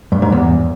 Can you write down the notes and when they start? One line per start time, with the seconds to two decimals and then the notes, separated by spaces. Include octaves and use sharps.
0.12 G2
0.22 G#2
0.32 E2